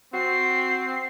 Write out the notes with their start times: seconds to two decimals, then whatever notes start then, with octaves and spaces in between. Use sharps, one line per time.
0.14 C4 F#4 C7